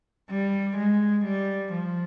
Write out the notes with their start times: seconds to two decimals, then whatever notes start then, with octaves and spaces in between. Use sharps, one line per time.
0.30 G3
0.77 G#3
1.25 G3
1.73 F3